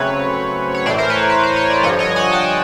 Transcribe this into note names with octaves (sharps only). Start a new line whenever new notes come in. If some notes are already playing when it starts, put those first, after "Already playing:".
Already playing: C#3 F#3 A3 C4 B4 C#5
C#5
A2 E3 A3 C5 D5
A#4 C5
B4 C#5
B4
C5
C#5
D5
G2 D3 F3 C#5 D#5
C#5 D#5
F#5 G#5
G5 A5